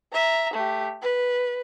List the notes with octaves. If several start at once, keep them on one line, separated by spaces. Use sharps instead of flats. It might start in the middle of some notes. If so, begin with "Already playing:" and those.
E5 A#5
A3 G4
B4